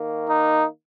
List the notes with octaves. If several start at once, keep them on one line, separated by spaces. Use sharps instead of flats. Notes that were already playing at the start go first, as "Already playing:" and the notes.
Already playing: D#3 A#3
D#4